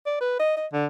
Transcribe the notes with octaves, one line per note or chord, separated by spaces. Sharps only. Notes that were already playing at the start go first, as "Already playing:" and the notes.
D5
B4
D#5
D#5
D3